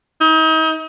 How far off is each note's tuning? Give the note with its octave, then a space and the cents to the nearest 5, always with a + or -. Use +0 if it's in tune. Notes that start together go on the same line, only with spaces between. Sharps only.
D#4 +35